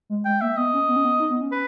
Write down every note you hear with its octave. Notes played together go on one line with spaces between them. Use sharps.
G#3
G#3 G5
A#3 E5
B3 D#5
C#4
B3
C#4
B3
D#4
B3
C#4
B4